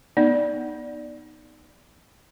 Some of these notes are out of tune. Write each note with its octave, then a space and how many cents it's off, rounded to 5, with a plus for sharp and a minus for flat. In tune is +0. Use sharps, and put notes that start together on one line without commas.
B3 -15 D#4 -10 D5 +0